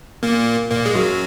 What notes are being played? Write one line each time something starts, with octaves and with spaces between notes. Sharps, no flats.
A#2 A#3
A#2 A#3
G#3
F#2 F#3